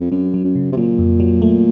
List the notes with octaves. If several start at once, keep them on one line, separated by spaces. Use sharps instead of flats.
F2
F#2 F#3
F#3
F#2
C#3
C3
A#2 F#3
F2
F#3
A3